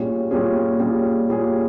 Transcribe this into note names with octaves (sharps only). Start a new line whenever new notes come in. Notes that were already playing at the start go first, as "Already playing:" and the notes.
Already playing: A#2 G3 C#4 G#4
A#2 G3 C#4 G#4
A#2 G3 C#4 G#4
A#2 G3 C#4 G#4